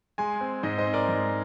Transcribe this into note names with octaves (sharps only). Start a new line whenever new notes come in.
G#3 G#5 C6
C4
G#2 C5 D#5
C5 D#5
C4
A#4 D5
G#2